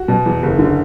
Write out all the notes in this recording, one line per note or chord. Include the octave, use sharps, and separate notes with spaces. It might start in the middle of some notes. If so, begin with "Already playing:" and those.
Already playing: F#4
B2
E2
F#1
D3